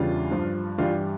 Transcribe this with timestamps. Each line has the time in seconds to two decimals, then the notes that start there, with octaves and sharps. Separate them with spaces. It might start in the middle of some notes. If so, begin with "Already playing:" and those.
Already playing: E2 C#3 E3 G3 D4 F4
0.31 G2 F3
0.78 G2 E3 G3 D4 F4